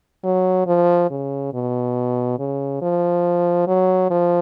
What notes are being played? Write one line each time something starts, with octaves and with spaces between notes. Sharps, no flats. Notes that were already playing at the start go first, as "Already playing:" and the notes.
F#3
F3
C#3
B2
C#3
F3
F#3
F3